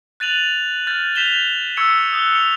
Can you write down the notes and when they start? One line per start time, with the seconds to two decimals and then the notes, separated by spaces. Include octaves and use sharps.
0.20 F#6 A6 D#7 F7 F#7
0.87 F6 G6 A6
1.15 G6 B6 E7 F7 G7
1.77 C#6 E6 G#6 C#7
2.12 D#6 F#6 G7
2.33 C#7 F7